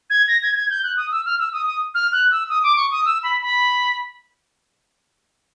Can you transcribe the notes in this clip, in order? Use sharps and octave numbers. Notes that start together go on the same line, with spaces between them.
G#6
A#6
G#6
G#6
G6
F#6
D#6
E6
F6
E6
D#6
D#6
F6
F#6
E6
D#6
D6
C#6
D#6
E6
B5
B5